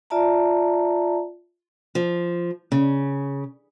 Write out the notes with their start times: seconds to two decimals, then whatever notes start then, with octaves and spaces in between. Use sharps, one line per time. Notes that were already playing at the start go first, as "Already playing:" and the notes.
0.10 F4 D5 E5 A5 A#5
1.95 F3
2.72 C#3